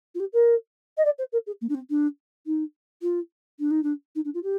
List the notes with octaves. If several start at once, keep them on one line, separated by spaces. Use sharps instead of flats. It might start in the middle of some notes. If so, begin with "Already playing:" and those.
F4
G4
A#4
D#5
D5
C5
A#4
G#4
A#3
D4
C4
D4
D#4
F4
D4
D#4
D4
D#4
D4
F4
G4